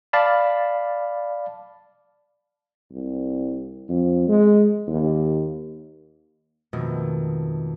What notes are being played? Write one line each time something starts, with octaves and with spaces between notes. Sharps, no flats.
D5 F5 A5 B5
C2
F2
G#3
D#2
F2 G#2 B2 D#3 A3